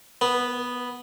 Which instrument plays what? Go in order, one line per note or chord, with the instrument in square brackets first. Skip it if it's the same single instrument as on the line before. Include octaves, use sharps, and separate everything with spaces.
[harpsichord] B3